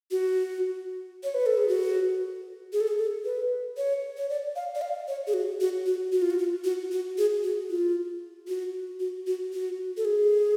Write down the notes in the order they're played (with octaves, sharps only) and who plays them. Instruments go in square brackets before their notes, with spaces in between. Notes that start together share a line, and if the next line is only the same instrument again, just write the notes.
[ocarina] F#4
C#5
B4
A4
G#4
F#4
G#4
A4
G#4
A4
B4
C#5
C#5
D5
F5
D5
F5
C#5
G#4
F#4
F#4
F#4
F#4
F4
F#4
F4
F#4
F#4
G#4
F#4
F4
F#4
F#4
F#4
F#4
A4
G#4